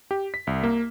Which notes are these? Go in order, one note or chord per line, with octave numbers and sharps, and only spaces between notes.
G4
B6
C2
A#3